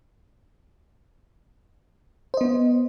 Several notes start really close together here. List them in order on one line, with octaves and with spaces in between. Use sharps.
C5 D#5 B3